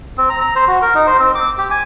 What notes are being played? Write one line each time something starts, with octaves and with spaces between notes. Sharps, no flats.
C4
A#5
A#5
C5
F#4
A#4
D#4
C5
C4
D6
G4
G#5